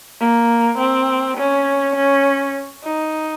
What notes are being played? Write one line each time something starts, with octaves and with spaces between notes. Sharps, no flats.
A#3
C4
C#4
C#4
D#4